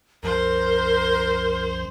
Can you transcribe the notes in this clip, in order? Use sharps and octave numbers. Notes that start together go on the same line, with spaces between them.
C2 F#2 F3 A#4 C5